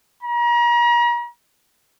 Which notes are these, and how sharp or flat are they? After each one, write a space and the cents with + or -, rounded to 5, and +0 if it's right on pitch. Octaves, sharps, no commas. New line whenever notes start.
A#5 +40